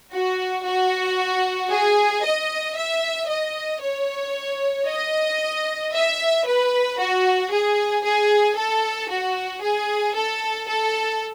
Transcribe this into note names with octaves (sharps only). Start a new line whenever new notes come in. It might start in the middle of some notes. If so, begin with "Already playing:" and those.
F#4
F#4
G#4
D#5
E5
D#5
C#5
D#5
E5
B4
F#4
G#4
G#4
A4
F#4
G#4
A4
A4